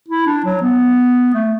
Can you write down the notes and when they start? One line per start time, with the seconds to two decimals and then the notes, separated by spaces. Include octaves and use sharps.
0.09 E4
0.27 D4
0.45 F#3
0.62 B3
1.34 A3